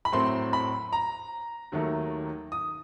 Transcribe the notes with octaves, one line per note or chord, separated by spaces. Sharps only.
B5
A2 F#3 A3 C4 C6
B5
A#5
D#2 D#3 F#3 A3
D#6